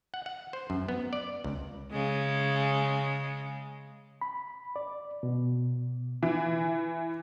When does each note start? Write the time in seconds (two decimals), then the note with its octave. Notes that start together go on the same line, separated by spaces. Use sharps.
0.14 F#5
0.26 F#5
0.53 C5
0.70 F#2
0.88 B3
1.13 D5
1.44 C#2
1.91 C#3 G#3
4.21 B5
4.76 D5
5.23 B2
6.23 E3